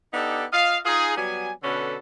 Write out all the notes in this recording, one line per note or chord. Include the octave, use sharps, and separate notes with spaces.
B3 D4 D#4 G4 A4
F4 D#5 F5
D#4 F4 G#4
F#3 G3 B3 G#5
B2 D3 C#4 A4 B4